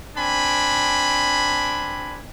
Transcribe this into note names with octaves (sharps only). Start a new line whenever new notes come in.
C4 D4 G#5 B5